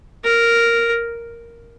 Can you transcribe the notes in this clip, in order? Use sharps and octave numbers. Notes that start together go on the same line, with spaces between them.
A#4